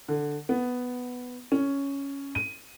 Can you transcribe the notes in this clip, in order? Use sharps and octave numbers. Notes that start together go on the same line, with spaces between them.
D3
B3
C#4
D#7